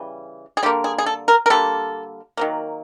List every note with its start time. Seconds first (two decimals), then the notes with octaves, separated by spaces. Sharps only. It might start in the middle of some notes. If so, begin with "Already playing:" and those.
Already playing: C#3 E3 G3
0.57 G#4
0.63 D3 G3 A#3 G4
0.84 G#4
0.98 G#4
1.06 A4
1.28 A#4
1.46 A#4
1.50 D3 G3 A#3 A4
2.37 D#3 F#3 A#3